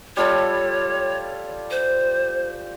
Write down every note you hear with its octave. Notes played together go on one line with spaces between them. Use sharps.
G3 F4 A4 C#5
C5